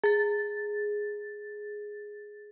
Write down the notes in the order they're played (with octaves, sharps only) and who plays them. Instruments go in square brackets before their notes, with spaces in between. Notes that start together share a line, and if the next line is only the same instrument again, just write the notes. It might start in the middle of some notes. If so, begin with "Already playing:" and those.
[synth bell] G#4 A6